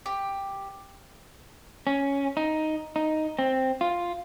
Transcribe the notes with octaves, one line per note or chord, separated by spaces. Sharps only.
G4
C#4
D#4
D#4
C4
F4